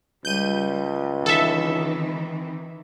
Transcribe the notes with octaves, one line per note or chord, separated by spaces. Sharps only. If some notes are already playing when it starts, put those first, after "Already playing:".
C#2 G3 G6 D#7
D#3 E3 C4 A4 E5